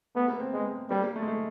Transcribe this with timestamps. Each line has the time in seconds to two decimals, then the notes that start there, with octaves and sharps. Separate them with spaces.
0.15 A3 B3
0.28 A#3
0.40 C4
0.52 G#3 B3
0.90 G3 A#3
1.02 A#3
1.16 A3
1.22 G#3
1.28 A3